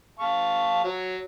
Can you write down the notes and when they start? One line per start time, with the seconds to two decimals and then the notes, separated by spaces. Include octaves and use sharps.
0.19 F5 A5 C#6
0.84 F#3 C#5